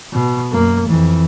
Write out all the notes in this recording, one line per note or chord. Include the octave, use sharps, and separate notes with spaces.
B2
F#2 A#3
F2 E3